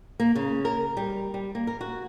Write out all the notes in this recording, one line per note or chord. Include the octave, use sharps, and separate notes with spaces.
A#3
C#3
A#4
G3
G3
A#3
A#4
F#4